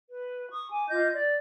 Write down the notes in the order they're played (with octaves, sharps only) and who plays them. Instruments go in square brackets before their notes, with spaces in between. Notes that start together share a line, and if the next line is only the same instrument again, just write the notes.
[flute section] B4
C#6 D#6
G#5 D6
F4 D#5 D6 G6
D5